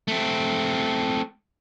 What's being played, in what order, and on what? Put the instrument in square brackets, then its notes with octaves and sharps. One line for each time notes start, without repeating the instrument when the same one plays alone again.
[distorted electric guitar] A3 C4